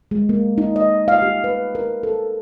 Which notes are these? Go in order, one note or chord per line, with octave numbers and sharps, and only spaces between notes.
G#3
A#3
D#4
D#5
F5
G4
B4
A#4
A4